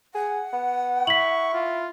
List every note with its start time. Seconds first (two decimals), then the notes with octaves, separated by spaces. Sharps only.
0.14 G#4 F#5
0.52 B3
1.07 E4 C#6 B6 F#7
1.54 F4